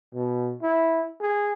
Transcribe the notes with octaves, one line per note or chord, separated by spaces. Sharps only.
B2
E4
G#4